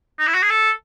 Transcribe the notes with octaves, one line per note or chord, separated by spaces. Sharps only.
D#4
E4
F#4
G#4
A4